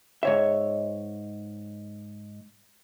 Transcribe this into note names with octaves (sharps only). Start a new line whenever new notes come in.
G#2 C#5 E5